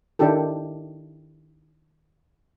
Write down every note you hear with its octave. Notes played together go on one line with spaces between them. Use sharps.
D#3 D4 E4 G4 A4